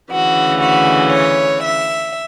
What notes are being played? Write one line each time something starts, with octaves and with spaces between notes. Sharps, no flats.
D2 C#3 E3 F#4
F#4
C#5
E5